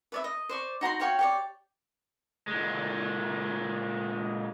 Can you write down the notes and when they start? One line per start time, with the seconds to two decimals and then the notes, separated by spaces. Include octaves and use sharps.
0.12 B4 D5 E5
0.24 D#5
0.49 C5 D5 C#6
0.81 D#4 F#4 A#5 C6
1.00 F#4 C#5 F5 G5
1.19 G4 C#5 D5
2.48 A#2 G#3